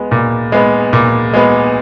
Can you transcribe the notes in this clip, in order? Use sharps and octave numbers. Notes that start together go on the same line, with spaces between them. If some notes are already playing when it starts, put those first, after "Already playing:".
Already playing: G#3 B3
A#2
G#3 B3
A#2
G#3 B3